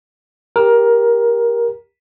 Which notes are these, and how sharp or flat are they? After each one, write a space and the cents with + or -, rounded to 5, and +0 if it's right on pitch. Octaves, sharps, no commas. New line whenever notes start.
G4 +10 A#4 +15